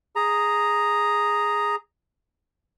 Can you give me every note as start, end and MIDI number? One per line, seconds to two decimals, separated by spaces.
0.16 1.76 68
0.16 1.76 82